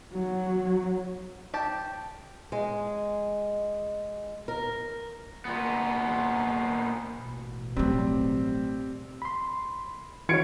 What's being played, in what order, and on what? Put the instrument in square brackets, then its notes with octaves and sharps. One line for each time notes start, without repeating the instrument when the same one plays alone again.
[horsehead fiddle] F#3
[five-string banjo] G4 A5
[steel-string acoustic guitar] G#3
A#4
[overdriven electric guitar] A#2 B3
[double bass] A1 B2
[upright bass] F#3 A3 [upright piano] G3 C4
[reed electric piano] B5 C6
[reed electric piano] E3 F#4 C#5 [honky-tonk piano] G#6 C#7 D7